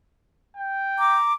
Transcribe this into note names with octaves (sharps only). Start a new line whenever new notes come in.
G5
A#5 D6